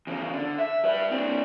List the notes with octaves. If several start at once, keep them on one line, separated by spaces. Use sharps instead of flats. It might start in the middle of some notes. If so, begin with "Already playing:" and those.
E2 C#3
D3
E5
G3 B4
C4 D4